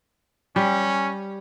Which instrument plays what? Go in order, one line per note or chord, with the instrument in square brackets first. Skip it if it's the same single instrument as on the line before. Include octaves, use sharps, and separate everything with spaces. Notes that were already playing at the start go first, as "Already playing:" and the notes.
[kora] G3 [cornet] C#4